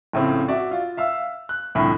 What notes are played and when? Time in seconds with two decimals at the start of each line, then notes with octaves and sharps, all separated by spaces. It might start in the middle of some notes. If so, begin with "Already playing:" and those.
0.13 A#1 A2 C#3 C4
0.48 F#4 D5 E5
0.71 F4
0.97 E5 F5 E6
1.49 F#6
1.75 C2 F2 A2 D3